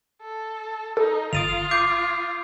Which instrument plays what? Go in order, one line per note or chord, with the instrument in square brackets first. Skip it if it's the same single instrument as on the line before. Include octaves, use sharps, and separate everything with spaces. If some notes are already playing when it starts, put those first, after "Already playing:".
[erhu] A4
[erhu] D#4 [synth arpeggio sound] A4
[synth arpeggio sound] G1 A6 D7 [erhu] F4 [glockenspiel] D#6 D#7 F7
[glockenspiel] D6 G6 C7